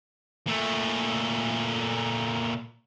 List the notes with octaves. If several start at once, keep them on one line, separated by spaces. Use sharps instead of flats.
A#2 A3